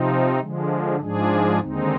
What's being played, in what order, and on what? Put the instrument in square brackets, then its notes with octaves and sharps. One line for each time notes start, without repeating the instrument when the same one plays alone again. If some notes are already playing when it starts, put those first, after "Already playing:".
Already playing: [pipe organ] C3 F3 C4 D#4
D3 F3 G#3
G#2 F3 G#3 D4 G#4
D#2 D3 G#3 C4 D#4